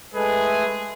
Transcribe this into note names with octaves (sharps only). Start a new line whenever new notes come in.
G#3 A3 G#4 B4